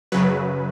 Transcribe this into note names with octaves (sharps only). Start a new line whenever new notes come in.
F#2 C#3 F#3 B4